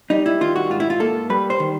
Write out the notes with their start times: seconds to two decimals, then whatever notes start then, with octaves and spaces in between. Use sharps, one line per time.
0.10 G3 D#4
0.26 E4
0.41 D#3 F4
0.56 F#4
0.70 G#2 F4
0.80 E4
0.90 F4
1.00 A#3 A4
1.30 G3 B4
1.50 C5
1.60 D#3